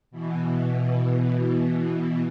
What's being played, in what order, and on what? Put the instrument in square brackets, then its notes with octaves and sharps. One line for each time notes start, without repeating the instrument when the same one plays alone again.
[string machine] B2 E3